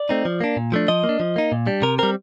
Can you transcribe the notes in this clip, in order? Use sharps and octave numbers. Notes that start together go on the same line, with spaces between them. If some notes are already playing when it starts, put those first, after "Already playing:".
Already playing: D5
A3 C4 D#4
F3
A#3 D4
A#2
F3 A3 D4
F3 D#5
A#3
D4
F3
A#3 D#4
A#2
G3 D4
C3 A#4
G3 C4 A#4